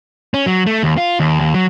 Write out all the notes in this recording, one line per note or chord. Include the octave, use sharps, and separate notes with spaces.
C#4
F#3
A3
D#2
F4
D#2
D#2
F#3